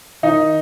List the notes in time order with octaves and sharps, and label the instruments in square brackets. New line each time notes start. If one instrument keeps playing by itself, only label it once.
[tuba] D#3 [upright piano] D#4